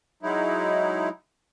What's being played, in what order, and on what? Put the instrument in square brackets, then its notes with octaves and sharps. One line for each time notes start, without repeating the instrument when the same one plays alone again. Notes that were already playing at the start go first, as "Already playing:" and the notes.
[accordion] F#3 G#3 D#4 E4